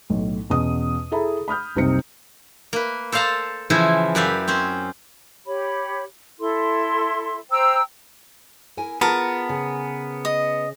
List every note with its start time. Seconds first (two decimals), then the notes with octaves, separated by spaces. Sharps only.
0.10 B1 A2
0.50 E2 B2 C#4 D#6
1.11 E4 G#4 A4 E5 A#5 B5
1.48 B5 D#6 F6 G6
1.75 F#1 C2 C3 C4 D#4 C#7
2.73 A#3 B4
3.12 A4 C5 D5 F5 A5 A#5
3.70 C#3 E3 F3 E4 C5 G#5
4.15 F#2 G4 B4 D5 E5 F5
4.48 C4 C#4 C5
5.46 G4 C#5 B5
6.40 E4 A4 C6
7.50 C5 G5 A#5 E6
8.77 E4 A#4 G#5
9.01 B3 F4 G#4 A#4 A5
9.49 C#3 G#4
10.25 D#5